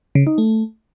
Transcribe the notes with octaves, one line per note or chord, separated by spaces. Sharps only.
C#3
D#4
A3